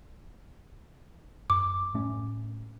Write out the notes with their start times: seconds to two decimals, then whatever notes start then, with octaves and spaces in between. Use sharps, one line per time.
1.50 F#2 D6
1.94 A2 A3 C#4